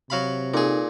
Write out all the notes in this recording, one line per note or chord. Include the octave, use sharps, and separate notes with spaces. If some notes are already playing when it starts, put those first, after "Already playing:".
C3 F#3 F5 B5
A#2 D#4 G#4 A4